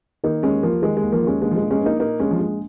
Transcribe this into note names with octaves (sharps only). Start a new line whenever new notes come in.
D#3 A#3 D#4
D#2 G#3 C#4
D#2 F3 A#3
D#3 G#3
G#3
D#2
F3 A#3
D#3
G#3 C#4
A#1 G#3
F3
A#1 G#3
G#3 C#4
A#1
A#3 D#4
A#2 A#3 D#4
A#1 G#3 C#4
F3
A#1 G#3